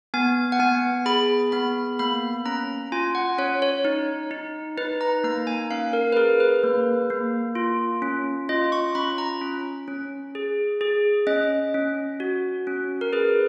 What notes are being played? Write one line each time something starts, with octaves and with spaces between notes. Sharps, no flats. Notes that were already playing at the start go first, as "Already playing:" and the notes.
B3 G#5
F#5
B3 G#5
G#4 B5
B3 B5
A#3 B5
C#4 A#5
F4 G#5
F#5
C#4 C#5
C#5
D#4
D#4
D#4 B4
A#5
A#3 A#5
G#5
C#4 F5
A#4
B4
G#4 A#4
B4
A#3
A#3
F4
C#4
F4 D#5
C#6
C#4 B5
A#5
C#4
C#4
G#4
G#4
C#4 D#5
C#4
F#4
C#4
A#4
G#4 B4